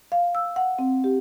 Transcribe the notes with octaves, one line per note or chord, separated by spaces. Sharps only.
F5
E6
F#5
C4
G4